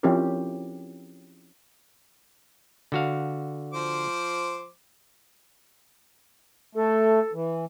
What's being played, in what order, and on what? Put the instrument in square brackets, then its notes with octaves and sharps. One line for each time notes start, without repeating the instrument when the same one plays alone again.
[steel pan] F3 C4 C#4 E4 G4 A#4
[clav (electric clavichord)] D3 F#4 F5
[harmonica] F3 C5 D6
[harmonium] A3 [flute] A4
[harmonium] E3